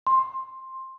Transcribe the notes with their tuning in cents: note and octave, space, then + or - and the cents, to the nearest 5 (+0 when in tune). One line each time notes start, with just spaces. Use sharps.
C6 +10